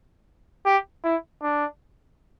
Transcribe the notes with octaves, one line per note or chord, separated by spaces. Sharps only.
G4
E4
D4